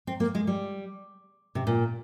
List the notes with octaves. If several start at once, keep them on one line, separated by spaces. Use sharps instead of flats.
C4
A#3
G#3
G3
C3
A#2